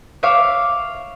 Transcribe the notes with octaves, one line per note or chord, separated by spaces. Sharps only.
C#5 E5 F5 D6